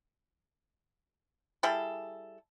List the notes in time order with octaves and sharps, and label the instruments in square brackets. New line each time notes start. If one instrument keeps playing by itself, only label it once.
[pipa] G3 E4 G#4 A4